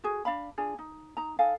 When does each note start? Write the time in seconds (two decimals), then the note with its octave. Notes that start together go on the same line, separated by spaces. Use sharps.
0.04 F#4 G#4
0.25 D4 F5 B5
0.58 D4 F4 G#4
0.79 D#4
1.17 D#4 A#5
1.39 D#4 A4 F5 G#5